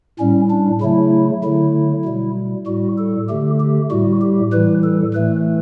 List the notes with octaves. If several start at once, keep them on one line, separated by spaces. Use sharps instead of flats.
A2 G3 C#4
D4
C#3 F#3 A3 E4
D3 F#3 A3 E4
B2 G3
A2 G3 F#4
A4
D3 A3 G4
G4
A2 G3 F#4
G4
A2 E3 G3 B4
A4
A2 E3 A3 B4